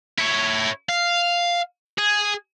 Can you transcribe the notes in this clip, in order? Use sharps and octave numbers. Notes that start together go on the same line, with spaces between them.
E4 C#5
F5
G#4